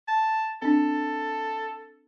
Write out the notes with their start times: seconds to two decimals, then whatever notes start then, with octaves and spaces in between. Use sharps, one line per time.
0.08 A5
0.62 C4 D4 A4